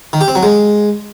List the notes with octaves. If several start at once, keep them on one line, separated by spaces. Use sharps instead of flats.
D#3
G4
C4
F#3
G#3